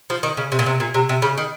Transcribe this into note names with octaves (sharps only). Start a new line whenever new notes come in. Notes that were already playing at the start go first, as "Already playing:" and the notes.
F3
D#3
C#3
C3
A#2
C3
A#2
C3
C3
C#3
D#3